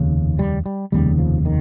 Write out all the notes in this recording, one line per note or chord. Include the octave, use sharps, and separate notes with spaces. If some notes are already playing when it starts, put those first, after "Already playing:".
Already playing: F1 D#2 C#3
G3
G3
F1 D#2 C#3 G3
F3
D#3